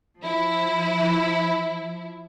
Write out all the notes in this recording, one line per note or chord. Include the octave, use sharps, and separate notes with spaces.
F3 E4